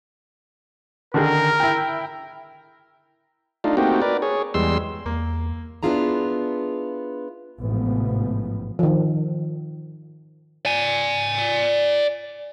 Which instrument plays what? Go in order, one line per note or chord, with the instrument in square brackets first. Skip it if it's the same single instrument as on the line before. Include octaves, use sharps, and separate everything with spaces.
[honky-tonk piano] D3 D#3 G#4 [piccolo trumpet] A#4
[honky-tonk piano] E4 G5
[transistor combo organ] A3 D4 D#4 F4
A3 A#3 C4 D#4 F#4 G4
A#4 B4 D5
G#4 C#5
E2 G3 G#3 C6 E6
[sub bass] E2 [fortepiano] A#3
[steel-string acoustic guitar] B3 D4 E4 F4 G#4 A#5
[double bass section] A1 G#2 C3 F3 B3
[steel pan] D#3 F3
[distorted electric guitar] D5 G#5